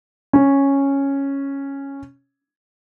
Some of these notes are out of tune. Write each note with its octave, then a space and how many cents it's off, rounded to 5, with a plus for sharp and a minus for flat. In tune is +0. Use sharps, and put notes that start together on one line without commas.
C#4 -5